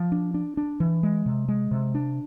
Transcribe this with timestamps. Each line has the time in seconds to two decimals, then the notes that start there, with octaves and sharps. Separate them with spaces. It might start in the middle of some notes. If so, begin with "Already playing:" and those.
Already playing: F3
0.12 D4
0.34 D4
0.57 D4
0.80 E3
1.03 G#3
1.26 C3
1.48 G#3
1.71 C3
1.95 D4